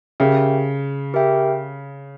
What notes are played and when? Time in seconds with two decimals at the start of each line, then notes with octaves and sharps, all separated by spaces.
0.20 C#3 G4 A#4 E5 G5
1.14 G4 A#4 E5 G5